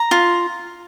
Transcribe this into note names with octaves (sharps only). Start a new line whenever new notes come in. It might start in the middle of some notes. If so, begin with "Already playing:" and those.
Already playing: A#5
F4